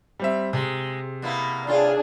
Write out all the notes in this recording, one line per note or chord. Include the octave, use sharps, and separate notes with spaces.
G3 C4 E5
C3 G#3
B2 A#3 E4
A2 D4 F4 G#4